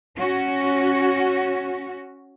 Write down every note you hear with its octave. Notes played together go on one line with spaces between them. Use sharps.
C#4 F#4